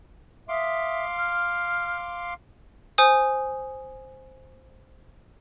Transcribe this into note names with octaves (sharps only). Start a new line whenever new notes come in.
E5 F5 C6 D6 D#6
F6
C5 G#5 D#6